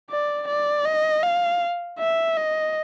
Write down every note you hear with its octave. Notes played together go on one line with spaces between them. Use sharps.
D5
D5
D#5
F5
E5
D#5